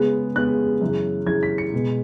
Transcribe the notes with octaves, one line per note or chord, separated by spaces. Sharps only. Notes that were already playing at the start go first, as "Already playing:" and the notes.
Already playing: C#3 G#3 B3
C#3 G#3 B3 F#6
F#2 C#3 E3
F#2 C#3 E3 G#6
B6
C#7
B2 G#3 B3